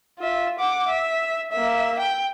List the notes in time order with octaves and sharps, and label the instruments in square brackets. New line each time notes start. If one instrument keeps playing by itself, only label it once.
[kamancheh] F4 E5
F#5 D6
E5
A#3 E5
G5